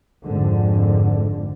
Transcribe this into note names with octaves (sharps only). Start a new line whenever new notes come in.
G#1 F2 G#2 D3